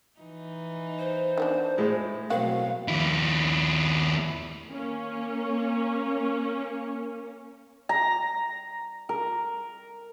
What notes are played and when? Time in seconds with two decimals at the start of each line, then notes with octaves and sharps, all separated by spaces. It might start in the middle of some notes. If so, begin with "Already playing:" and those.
0.19 E3 D#4
0.98 C5
1.38 D#3 B3 D4
1.78 A2 G#3
2.30 B2 F#3 A3 A#3 C4 F#4 F5
2.88 D#2 E4
4.70 A#3 C#4
7.89 A#5
9.09 A#4